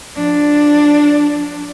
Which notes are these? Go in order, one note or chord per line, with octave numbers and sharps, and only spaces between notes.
F3 D4